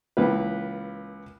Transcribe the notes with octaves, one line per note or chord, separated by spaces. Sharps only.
C#2 E3 A#3 B4